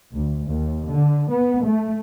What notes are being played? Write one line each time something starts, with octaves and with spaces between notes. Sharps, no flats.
D2
D#2
D3
B3
A3